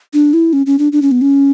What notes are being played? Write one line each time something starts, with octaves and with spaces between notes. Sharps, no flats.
D4
E4
C#4
C#4
D4
D4
C#4
B3
C#4